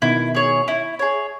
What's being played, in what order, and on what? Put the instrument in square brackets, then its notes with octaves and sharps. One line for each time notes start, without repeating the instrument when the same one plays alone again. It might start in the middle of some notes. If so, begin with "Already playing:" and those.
[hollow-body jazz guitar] B2 D#3 [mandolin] E4
[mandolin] G#4 C#5
E4
G#4 C#5